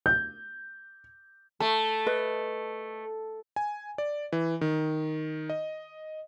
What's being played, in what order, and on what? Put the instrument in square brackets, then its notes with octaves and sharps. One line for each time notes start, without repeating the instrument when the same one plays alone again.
[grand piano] G6
[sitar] A3 [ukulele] A5
[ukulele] B4 D#5
[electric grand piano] G#5
D5
E3
D#3
D#5